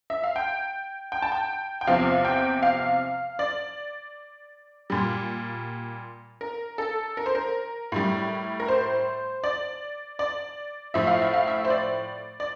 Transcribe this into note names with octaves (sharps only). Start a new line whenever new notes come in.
E5
F5
G5
G5
A5
G5
G5
E2 C3 F3 F5
G5
F5
D5
A#2 G3
A#4
A4
A#4
C5
A#4
A2 G3
A#4
C5
D5
D5
A2 F3 E5
F5
E5
F5
E5
C5
D5
D5